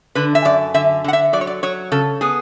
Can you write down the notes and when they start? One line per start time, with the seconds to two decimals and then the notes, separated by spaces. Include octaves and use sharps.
0.15 D3 B4
0.35 E5
0.45 F#2 D5
0.74 D3 E5
1.04 D3 F#5
1.13 E5
1.33 F#3 D5
1.41 C#5
1.47 D5
1.63 F#3 C#5
1.92 C#3 A4
2.21 B3 G#4